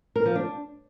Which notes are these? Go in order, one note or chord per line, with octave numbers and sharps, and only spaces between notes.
A#4
F3
D4